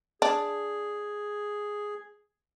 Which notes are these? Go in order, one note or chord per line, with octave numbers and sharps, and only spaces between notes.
D4 G#4